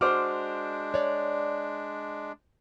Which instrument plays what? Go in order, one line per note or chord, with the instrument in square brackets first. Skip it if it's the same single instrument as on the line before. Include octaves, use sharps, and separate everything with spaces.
[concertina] G#3 D4 [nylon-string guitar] F#4 [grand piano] C5 D6 F6
[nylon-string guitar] C#5 D5